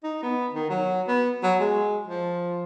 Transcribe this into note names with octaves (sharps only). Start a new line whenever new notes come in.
D#4
B3
D#3
F#3
B3
F#3
G#3
F3